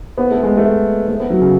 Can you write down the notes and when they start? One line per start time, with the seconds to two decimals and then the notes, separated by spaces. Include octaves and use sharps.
0.18 B3
0.31 A3
0.43 G#3
0.57 A3
1.07 A3
1.20 B3
1.30 F#3
1.42 C#3